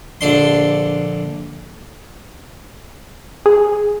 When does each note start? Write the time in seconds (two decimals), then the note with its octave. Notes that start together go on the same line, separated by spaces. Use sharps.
0.21 A#1 D3 D4 C6
3.46 G#4